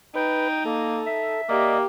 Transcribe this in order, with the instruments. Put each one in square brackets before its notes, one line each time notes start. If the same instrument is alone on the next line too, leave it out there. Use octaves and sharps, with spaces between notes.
[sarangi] D#4 [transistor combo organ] B4 [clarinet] G5
[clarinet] A#3 [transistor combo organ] A4
[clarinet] E5
[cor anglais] A#3 [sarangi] G4 [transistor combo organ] D5 D#5